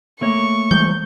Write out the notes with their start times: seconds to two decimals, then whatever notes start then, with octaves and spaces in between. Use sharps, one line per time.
0.21 A3 A#3 C#5 C#6
0.71 E3 G3 G#3 G6